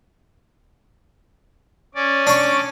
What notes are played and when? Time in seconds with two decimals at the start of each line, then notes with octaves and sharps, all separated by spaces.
1.95 C#4 D5
2.27 D4 C#6